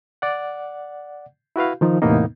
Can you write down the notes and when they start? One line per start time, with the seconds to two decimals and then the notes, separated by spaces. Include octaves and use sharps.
0.22 D5 F#5
1.56 E4 F#4 B4 F5
1.81 D#3 F3 D#4
2.02 E2 A2 C3 A#3 B3 D#4